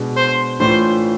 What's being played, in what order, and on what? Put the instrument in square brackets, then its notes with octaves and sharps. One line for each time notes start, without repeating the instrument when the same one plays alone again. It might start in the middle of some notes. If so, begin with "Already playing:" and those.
Already playing: [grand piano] B2 G#3 D4
[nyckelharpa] C5
[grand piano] A2 E3 A3 D4 F4 [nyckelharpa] C5